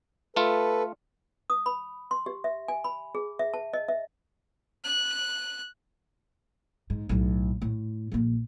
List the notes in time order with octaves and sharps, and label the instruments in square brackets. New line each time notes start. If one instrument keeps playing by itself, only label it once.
[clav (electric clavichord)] A3 F4 [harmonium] A4 B4
[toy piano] D#6
B5
C6
G4
E5
G#5
B5
G#4
E5
A5
D#5
E5
[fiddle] F#6
[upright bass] G#2
B1 A2
A2
A#1 A#3